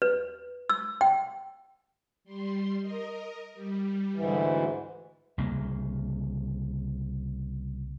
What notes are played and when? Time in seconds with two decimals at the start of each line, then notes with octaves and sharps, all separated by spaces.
0.02 B4
0.70 E6
1.01 G5
2.24 G3 C6
2.81 A#4 D#5
3.54 G3
4.15 D2 G#2 E3
5.38 C2 C#3 A#3